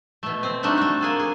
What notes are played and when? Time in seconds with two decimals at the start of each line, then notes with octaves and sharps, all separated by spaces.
0.23 B2 A3
0.43 C4
0.63 G3 A3 D4 D#4 F#4
0.78 A3 F#4
1.01 A#3 G#4 A4
1.19 G#4